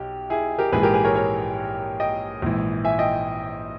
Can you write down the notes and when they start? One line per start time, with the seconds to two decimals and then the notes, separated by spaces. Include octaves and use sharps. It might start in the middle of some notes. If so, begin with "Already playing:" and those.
Already playing: B1 G4
0.30 E4 G#4
0.58 G4 A#4
0.73 A#1 G#2 E3 G#4 B4
0.83 G4 A#4
0.94 G#4 B4
1.04 A#4 C#5
1.15 A#4 C#5
2.00 D#5 G5
2.42 A#1 G#2 E3
2.85 E5 G#5
2.99 D#5 G5